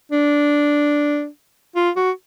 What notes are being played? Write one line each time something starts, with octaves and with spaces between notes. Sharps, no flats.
D4
F4
F#4